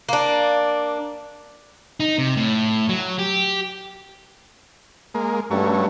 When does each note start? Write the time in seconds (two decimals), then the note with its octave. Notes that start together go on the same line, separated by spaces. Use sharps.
0.09 A#3 D4
2.00 D#4
2.18 C3
2.37 A2
2.89 F#3
3.19 G4
5.14 G#3 A#3
5.51 G2 F#3 A3 C#4